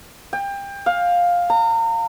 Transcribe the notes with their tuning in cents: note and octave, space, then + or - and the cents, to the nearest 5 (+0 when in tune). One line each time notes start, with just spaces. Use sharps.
G5 +25
F5 +10
A#5 -35